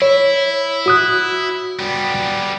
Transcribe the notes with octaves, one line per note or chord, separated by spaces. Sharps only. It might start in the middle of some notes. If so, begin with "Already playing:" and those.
E4 C#5
F#4 D#6 F#6
G3 B3